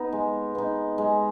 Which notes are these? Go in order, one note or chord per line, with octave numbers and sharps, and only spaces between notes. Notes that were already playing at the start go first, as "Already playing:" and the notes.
Already playing: B3 D#4
G#3
B3 D#4
G#3